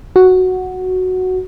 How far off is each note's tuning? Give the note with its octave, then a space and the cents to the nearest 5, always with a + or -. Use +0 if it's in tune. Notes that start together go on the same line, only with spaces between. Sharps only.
F#4 +0